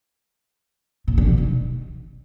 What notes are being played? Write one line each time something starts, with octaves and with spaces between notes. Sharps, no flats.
A#2
D3
B2
D#3